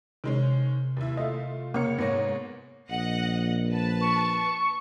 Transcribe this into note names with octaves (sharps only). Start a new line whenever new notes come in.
C3 D#3 G#3 C#4
D#2 E4
A3 F4 D#5 E5
C#3 A#3 C#5 C#7
G#2 A#3 B3 C#5 A#6
A#1 D#5 F#5
B4 A5
C#6